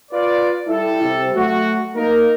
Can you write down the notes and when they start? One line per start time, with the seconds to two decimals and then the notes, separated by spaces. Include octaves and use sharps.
0.11 F4 B4 D5
0.68 G3 E4 A4
1.02 C3
1.35 F#3 A3 F#4
1.96 A#3 D#4 A#4